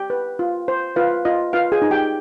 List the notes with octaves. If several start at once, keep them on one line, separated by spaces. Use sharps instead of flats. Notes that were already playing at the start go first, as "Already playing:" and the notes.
Already playing: G4 G5
B4
F4
C5
F4 B4 F5
F4 D#5
F4 B4 F5
G#4 G#5
D#4
G4 G5